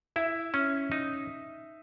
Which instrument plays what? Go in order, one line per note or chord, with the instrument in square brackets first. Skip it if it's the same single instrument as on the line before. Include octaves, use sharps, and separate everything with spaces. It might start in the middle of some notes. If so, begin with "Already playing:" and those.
[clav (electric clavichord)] E4 [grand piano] E5
[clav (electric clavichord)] C#4
D#4